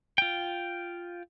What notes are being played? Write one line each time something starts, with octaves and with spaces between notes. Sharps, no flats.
F4 G5